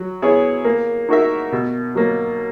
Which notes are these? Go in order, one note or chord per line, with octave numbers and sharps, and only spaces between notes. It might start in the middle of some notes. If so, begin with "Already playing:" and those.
Already playing: F#3
B3 E4 G#4 C#5
A#3
D#4 F#4 A#4 E5
B2
F#3 A#3